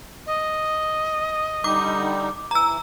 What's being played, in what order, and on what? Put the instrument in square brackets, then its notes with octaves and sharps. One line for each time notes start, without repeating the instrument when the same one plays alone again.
[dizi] D#5
[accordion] D3 G3 D#4 [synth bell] D6
[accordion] E3 [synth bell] A#5 E6